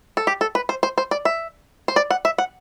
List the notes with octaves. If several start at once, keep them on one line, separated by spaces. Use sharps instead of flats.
A4
G4
A4
B4
C5
C5
C5
D5
E5
C5
D5
F#5
E5
F#5